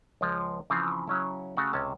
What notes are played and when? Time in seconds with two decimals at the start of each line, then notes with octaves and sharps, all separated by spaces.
0.21 C#2 F3 G#3
0.70 C#3 E3 F3 C4
1.08 C#3 F#3 C#4 E4
1.57 C#3 A3 F#4 F#5
1.73 C#2 C3 C#4 A5